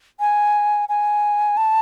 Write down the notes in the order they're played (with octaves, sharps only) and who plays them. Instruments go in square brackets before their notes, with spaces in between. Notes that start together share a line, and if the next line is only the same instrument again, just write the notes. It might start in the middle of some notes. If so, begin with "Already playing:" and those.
[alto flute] G#5
G#5
A5